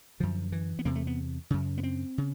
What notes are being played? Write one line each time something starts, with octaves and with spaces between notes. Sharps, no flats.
F#2 D3 F3
E3
B3
E2 C3 A#3
A3
B3
F#2 C#3
B3
C4
C#3